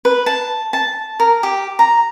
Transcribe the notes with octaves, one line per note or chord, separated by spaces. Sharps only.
B4
A5
A5
A#4
G4
A#5